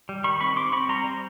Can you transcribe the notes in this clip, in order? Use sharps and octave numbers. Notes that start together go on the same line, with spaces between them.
G3
D#3 B5 C#6
C4 B5 C#6
C4 C6 D6
C4 B5 C#6
G3 A#5 C6
G3